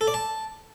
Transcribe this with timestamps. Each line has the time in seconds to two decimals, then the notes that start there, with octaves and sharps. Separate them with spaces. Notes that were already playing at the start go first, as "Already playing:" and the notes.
0.01 A4
0.07 D5
0.14 A5